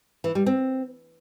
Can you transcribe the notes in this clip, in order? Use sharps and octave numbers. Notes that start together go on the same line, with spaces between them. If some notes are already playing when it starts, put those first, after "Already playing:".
E3
G3
C4